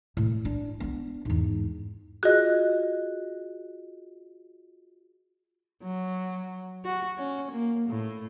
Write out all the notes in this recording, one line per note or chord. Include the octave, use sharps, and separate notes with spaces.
A2
D4
B3 D4
E2 G#2
F4 F#4 G#4 D#5 F#6
F#3
F#4
C#4
A#3
A2